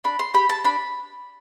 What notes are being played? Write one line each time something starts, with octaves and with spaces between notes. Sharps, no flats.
D4 B5
C6
G4 B5
A5
D4 B5